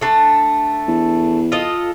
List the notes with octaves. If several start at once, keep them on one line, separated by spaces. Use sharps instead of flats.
A3 D4 A5
E2
F4 A4 D#5